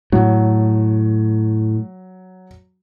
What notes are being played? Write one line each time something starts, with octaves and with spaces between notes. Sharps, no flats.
A2 F#3